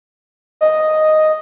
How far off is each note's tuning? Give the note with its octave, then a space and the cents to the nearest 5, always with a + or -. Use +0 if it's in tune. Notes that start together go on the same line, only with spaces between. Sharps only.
D#5 +0